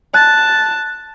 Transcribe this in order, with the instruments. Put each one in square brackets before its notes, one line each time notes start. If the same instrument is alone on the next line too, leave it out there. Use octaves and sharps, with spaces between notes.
[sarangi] A5 [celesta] F#6